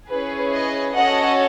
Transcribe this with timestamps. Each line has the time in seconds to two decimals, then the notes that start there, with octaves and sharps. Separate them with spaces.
0.10 C#4 E4 G#4 B4
0.53 B4 D#5
0.95 C#4 F#4 A4 D#5 F#5